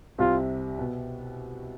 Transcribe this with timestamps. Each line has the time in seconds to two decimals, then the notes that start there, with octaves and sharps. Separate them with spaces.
0.18 C2 C3 F4
0.79 B2